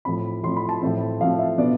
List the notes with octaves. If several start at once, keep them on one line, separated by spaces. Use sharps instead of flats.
A2 F3 C4 B5
A2 F3 C4 C6
B5
A5
A2 F3 A3 C4
A2 F3 A3 C4 F5
E5
B2 B3 D4 D5